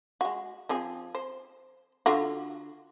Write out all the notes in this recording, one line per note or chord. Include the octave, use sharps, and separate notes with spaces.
G#3 F#4
F3 C4 G#4
C5
D3 F4 F#4